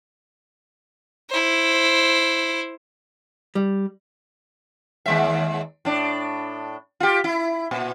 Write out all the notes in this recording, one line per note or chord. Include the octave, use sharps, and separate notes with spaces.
E4 C5
G3
D#2 G#3 E5
A2 D4
F4 G4
E4
A#2